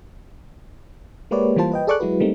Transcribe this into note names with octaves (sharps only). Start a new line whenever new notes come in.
G#3 A#3 G4 B4 C#5 D5
E3 G3 A#3 F4 C5 A5
B4 D#5 G5
G#4 A4 D5 C#6 D6 F#6
F#3 G#3 E4 F#4 B4
G3 A3 A#3 C4 D#4